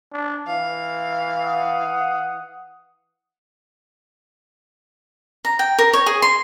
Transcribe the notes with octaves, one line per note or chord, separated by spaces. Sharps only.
D4
E3 F5
F#5 D#6
A#5
G5
A#4
C#5
G#4
C6